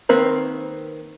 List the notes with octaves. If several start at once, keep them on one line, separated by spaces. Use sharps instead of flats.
D#3 A#3 C4 B4